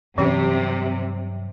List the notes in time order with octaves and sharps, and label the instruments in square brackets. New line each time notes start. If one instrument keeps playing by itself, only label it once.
[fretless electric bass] G2 F#3 G3 [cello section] C3 [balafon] E3 C#4 G4